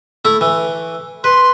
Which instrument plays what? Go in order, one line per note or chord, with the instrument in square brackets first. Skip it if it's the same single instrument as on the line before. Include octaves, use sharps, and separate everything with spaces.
[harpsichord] A3 E4
E3
[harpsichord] B4 [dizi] C6